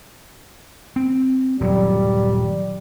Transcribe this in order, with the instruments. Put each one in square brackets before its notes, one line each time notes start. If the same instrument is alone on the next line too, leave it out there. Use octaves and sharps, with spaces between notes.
[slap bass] C4
[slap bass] D#1 G2 F#3 [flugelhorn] G3